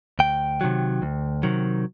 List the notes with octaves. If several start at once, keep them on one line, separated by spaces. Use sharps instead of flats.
D2 G5
C3 D#3 F#3
D2
C3 D#3 F#3